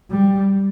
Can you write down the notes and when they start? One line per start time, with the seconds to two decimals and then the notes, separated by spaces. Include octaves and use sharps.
0.10 G3